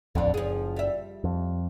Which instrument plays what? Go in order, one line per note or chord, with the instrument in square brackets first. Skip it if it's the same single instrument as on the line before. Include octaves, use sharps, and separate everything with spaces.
[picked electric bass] D#1 A1 F2 [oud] D3 D4
[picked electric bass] F#1 [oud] F3 G#4
[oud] G3 E5
[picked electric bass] F2